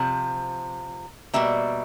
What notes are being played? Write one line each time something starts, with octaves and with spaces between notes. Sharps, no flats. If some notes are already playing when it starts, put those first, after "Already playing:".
Already playing: C3 F3
B2 G3 A#3 E5